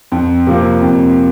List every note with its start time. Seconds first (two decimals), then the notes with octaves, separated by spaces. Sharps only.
0.12 F2
0.47 C3 F3 A#3
0.82 F2